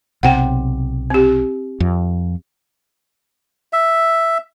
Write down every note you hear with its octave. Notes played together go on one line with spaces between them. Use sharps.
B1 C3 F#5 G5
C4 G4
F2
E5